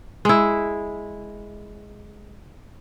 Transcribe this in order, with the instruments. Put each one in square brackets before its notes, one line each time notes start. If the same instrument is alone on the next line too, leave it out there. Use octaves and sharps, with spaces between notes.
[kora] G#3 E4